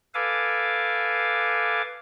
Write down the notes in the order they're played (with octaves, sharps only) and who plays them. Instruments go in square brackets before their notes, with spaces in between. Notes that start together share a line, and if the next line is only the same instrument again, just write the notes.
[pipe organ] A4 B4 F5 G#5 D6